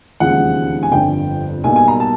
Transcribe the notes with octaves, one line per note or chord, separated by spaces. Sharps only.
E1 D#2 C#3 F3 G#3 F#5
G#5
G1 F2 D3 G5
B1 B2 G3 A#3 G#5
G#5
A#5
A5